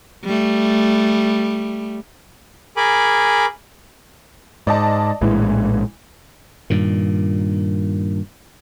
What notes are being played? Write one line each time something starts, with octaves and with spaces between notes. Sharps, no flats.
G3 A3
G#4 A#4 G#5 B5 D6
G#2 D5 D#5 A5
A#1 A2 E3 G#3
G2 A#2 D#3